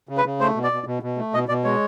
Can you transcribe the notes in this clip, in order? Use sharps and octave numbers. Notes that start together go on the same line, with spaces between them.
C#3
B4
C#3
A3 C5
B2
D5
B2
B2
B2
A3
B2 D#5
B2 D5
G#3 C#5